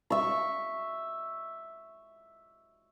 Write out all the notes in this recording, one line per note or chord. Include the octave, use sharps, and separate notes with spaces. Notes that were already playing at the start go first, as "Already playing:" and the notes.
E5 C#6